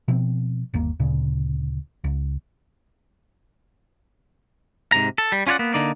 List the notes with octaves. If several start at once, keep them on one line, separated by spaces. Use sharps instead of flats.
B2 F3 C4
G1 D#2 A#3
D2 A#2 C#3
C#2
G#2 C3 A#5
A4
G3
C#4 F4 C#5 D5 F#5
A#3 B3
D3 A#3 D#4 D5